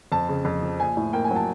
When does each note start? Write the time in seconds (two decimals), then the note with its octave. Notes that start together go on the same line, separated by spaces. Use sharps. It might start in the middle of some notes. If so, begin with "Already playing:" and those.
0.12 F2 A5
0.29 C#3
0.45 F2
0.62 F3
0.80 A#1 G#5
0.97 A2
1.13 A#3 G5
1.24 G#5
1.31 F#3
1.36 A5